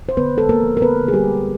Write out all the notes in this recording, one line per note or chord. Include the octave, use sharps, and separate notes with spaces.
C5
D3 B3 B4
G#3 A4
A#3 A#4
F3
A#4
D3 B3 B4
D3 G#4
G3 G4
G#3